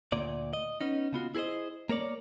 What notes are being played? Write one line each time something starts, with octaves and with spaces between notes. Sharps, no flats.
D2 A#2 D5
D#5
B3 C#4 D#4
C#3 B3 F4 F#4
E4 G#4 A#4 C5 D#5
A#3 A#4 C#5 D5